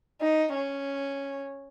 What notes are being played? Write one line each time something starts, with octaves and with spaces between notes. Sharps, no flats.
D#4
C#4